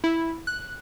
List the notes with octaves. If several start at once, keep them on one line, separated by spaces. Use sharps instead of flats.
E4
F#6